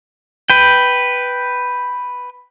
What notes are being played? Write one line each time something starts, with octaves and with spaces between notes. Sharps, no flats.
B4 G5